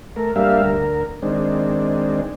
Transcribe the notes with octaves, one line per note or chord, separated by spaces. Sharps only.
A3 A#4
G2 G3 A#3 D4 E5 F5
D2 A#4
D#3 G#3 C4 D4